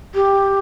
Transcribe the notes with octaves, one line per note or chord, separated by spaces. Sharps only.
G4